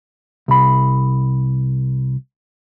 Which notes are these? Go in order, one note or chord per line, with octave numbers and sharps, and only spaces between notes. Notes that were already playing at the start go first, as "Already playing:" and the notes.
C2 B5